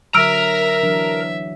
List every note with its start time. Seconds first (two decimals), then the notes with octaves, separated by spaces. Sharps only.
0.14 D3 F#3 A#4 E5 A#5 E6 F6 D7
0.83 E3 F#3 D4